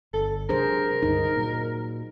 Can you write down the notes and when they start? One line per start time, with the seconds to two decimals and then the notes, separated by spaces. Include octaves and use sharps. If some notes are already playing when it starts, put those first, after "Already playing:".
0.14 G1 A4
0.49 C3 F#3 D4 G#4 A#4 C5
1.03 C#2 G2 D3 D#4
1.36 A#2 F#3